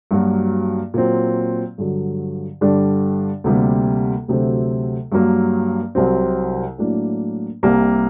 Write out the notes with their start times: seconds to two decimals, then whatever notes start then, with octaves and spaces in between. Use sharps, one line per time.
0.11 G2 F#3 A#3 F#4
0.94 A#2 F#3 C4
1.78 G2 D3 F#3
2.61 G2 D3 G3 D4
3.44 D2 C3 G3 A#3
4.28 D2 C3 F#3 A3 C4
5.12 G2 F#3 A#3
5.95 C2 C3 F#3 C4
6.78 A2 F#3 A#3 D4
7.63 C2 C3 G3 A#3